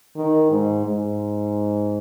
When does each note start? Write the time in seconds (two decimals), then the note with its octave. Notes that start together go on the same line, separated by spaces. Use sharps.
0.16 D#3
0.50 G#2
0.85 G#2